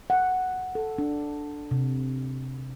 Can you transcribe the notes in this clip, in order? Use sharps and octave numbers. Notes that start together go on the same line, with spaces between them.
F#5
A4
D4
C3